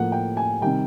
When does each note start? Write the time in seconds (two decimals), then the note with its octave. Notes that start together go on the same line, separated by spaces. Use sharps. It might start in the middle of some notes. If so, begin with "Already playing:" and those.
Already playing: A2 F3 A#3 F#5
0.12 G5
0.37 G#5
0.62 C3 D#3 G3 G5